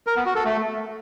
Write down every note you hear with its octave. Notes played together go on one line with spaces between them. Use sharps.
A#4
B3
F#4
A4
A3